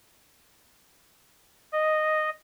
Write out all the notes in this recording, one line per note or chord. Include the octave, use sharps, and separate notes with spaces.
D#5